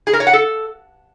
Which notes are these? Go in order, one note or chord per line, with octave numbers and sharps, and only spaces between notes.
G#4
A#4
C#5
F#5
A4